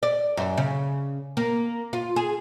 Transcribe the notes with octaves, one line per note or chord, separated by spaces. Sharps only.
D5
F#2
C#3
A#3
F4
G#4